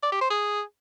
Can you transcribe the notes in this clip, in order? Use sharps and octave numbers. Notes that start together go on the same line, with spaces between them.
D5
G4
C5
G#4